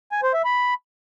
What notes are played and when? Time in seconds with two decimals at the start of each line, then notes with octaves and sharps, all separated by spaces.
0.12 G#5
0.23 C5
0.34 E5
0.45 B5